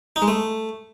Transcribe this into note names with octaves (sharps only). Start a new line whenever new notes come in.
D#4
G#3
A3